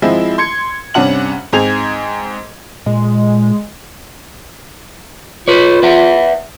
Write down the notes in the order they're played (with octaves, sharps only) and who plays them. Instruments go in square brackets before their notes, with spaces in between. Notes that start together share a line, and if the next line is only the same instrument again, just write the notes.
[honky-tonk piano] F3 G#3 C4 E4
C6 G#6 C#7
G2 C3 C#4 D4 F#5 F#7
G#2 C4 G#4 G#6 F7
[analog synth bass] A#2 [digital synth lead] G#3
[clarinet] F4 [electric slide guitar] B4 C#5
[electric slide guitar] B4 E5 F#5